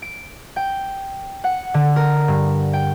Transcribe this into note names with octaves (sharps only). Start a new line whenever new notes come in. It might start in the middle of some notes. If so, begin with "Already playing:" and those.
D7
G5
F#5
D3
A#4
G2
G5